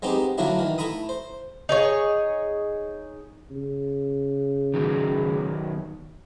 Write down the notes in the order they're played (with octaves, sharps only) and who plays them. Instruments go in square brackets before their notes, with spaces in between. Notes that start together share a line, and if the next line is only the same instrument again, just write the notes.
[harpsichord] G#3 B3 C4 D#4 G4
D3 F#3 A3 A#3 D4 E4
D#3 E3
A3 E4 A#5 B5 D#6
C5
[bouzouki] D#4 G#4 C#5
[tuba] C#3
[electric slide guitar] D#3 F#3 B3